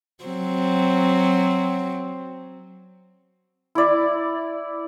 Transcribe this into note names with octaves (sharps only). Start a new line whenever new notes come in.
F#3 C4
E4 D5